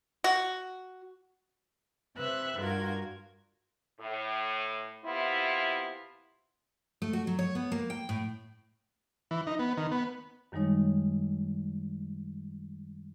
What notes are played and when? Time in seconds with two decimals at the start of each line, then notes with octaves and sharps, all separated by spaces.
0.24 F#4
2.17 C3 B4 E5 F#6
2.59 G2 F4 F#4 A#4 G#6
4.00 A2
5.05 C3 B3 E4 F4
7.02 A3
7.13 F#4
7.27 F#3
7.39 C#5
7.55 B3
7.72 A#3
7.90 G5
8.09 A2
9.31 E3
9.47 D#4
9.59 B3
9.77 D#3
9.91 B3
10.52 F#2 D#3 G3 G#3 D#4 C#5